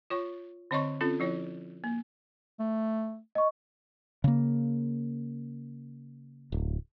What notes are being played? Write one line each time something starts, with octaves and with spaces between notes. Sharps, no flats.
F4 C#5 C#6
D3 C4 C#5 D#5 C6 C#6
C4 C#4 F4 A4
F3 E4 C#5
A#3
A3
D#5 C#6
C#3 A#3
D1